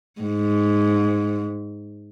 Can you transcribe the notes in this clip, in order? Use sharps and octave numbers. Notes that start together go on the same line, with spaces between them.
G#2